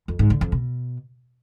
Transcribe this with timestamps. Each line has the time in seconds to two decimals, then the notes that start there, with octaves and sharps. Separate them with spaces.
0.08 F2
0.19 G#2
0.30 D3
0.41 F2
0.52 B2